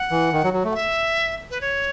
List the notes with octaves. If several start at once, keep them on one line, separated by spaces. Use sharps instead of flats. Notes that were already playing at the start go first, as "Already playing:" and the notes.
Already playing: F#5
E3
D#3
F#3
F#3
A3
F#5
E5
B4
C#5